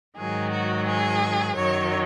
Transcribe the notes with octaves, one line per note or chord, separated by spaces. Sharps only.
G#2 D#3 F#3 G#4
F#4
G#4
F#2 D#3 F#3 C#5